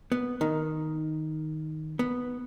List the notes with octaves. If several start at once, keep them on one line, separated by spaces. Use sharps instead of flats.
B3
D#3
B3